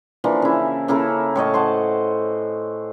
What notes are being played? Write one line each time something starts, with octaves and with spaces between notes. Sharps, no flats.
E3 F3 A#3 D4
C#3 E4
C#3 A#3 E4 A4
A2 C#5 D#5 A5
C5 F#5 A5